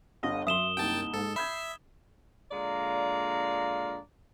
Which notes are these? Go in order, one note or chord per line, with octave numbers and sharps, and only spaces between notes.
G1 D3 D#5 F5
F#2 E5 C6 D#6 E7 G7
C2 A#3 D#4 G5 A5
G#2 A4
E5 B5 G6 G#6 C7
A#2 D3 G#3 D5 F5 A#5